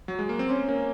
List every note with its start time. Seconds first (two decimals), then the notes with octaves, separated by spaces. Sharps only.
0.08 F#3
0.19 G#3
0.29 A#3
0.39 C4
0.50 A#3 C#4
0.68 A#3 C#4